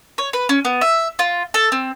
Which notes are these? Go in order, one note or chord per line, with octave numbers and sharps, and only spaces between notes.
C#5
B4
C#4
B3
E5
F4
A4
C4